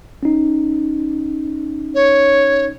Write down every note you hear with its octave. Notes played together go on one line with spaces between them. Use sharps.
C#4 D#4
C#5